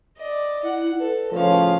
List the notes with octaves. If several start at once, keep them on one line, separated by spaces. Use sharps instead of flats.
D5 D#5
E4 F#5
A4 B4
A2 C#3 F3 C#4 F5